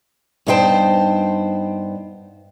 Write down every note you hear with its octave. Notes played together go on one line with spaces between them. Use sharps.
G2 B3 D#4 C5 G5 A5